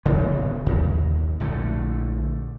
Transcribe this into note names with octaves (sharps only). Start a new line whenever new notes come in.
D1 C#3 B3
D#2
A#1 D3 G#3 A3